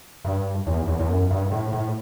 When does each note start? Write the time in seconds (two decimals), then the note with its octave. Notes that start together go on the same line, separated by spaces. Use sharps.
0.25 G2
0.67 E2
0.87 E2
0.99 E2
1.09 F#2
1.30 G2
1.51 A2
1.73 A2